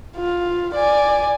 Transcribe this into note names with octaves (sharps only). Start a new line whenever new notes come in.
F4
D5 G#5